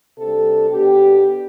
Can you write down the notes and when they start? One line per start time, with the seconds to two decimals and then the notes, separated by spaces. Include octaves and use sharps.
0.18 C3 G3 D4 A4
0.70 B2 B3 D4 G4